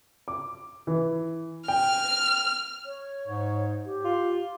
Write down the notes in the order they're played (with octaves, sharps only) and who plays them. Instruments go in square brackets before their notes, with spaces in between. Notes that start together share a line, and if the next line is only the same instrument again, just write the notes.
[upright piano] D6
E3
[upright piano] G5 [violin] F6
[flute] C#5
[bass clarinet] G#2
[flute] G4
[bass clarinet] F4